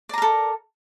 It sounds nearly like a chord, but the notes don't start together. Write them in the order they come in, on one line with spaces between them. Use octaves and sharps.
D5 A#5 A#4 A4